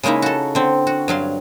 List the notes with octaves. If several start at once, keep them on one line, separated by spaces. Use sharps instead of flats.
C#3 G#3 A#3 D#4 E4
F#4 A4
D3 C4
F#4
G2 F#3 F5 C6